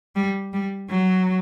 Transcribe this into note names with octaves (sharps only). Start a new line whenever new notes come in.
G3
G3
F#3